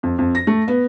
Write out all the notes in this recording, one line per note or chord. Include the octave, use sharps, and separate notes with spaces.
F2
F2
A#6
A3
B3